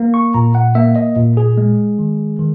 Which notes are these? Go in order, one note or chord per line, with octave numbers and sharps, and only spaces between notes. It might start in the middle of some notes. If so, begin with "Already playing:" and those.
Already playing: A#3
C#6
A#2 A#5
F#5
A#3 E5
D#5
A#2
G#4
G#3
D#3
D#3